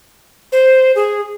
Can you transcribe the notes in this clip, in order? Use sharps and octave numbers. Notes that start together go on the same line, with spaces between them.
C5
G#4